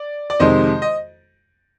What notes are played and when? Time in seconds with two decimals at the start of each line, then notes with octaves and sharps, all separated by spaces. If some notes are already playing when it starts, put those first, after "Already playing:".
Already playing: D5
0.30 D5
0.40 F2 C3 D#3 G#3 C5 D#5
0.82 D#5